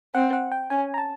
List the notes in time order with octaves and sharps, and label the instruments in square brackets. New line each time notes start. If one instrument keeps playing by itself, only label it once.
[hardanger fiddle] C4 [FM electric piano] F#5
[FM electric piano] F#5
G5
[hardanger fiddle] C#4 [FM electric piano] G#5
[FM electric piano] A#5
A5